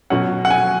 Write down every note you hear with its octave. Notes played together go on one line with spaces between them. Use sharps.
B2 F#3 C#4 F#5
F#5
G#5